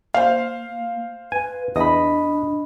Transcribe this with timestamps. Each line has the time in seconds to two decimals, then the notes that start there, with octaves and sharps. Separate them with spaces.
0.14 A#3 C5 F5
1.32 B4 G#5
1.76 E2 D4 D#5 B5